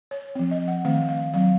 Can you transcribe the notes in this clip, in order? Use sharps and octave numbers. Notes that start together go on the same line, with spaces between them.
C#5
F3 C4
D#5
F#5
D#3 A3 C4 F5
F5
F#3 C4 F5